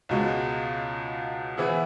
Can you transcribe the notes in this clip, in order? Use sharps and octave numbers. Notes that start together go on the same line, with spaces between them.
C#2 B2 G#3
E3 B3 E4 G#4